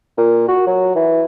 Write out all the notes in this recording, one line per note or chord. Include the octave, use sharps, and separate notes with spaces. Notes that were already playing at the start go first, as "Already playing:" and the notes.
A#2
F#4
F#3
E3